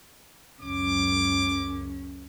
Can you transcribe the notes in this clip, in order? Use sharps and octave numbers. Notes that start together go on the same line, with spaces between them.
C#2 F#2 C#4 D6